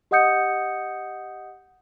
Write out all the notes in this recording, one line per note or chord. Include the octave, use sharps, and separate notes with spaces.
G4 D#5 F#5 D#6 G6 C#7